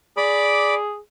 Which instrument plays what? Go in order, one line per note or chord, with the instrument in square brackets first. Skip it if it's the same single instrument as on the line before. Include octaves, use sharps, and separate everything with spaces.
[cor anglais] G#4 [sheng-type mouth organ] D5 B5 D6